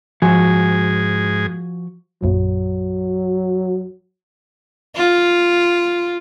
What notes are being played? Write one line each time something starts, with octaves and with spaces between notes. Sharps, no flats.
G#2 F3 F#4 G#4 G#5
A#1 F#2 A#2 F#3
F4